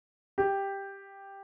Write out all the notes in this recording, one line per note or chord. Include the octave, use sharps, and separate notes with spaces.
G4